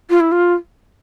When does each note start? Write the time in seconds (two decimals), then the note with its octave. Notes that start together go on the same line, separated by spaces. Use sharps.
0.10 F4
0.20 E4
0.32 F4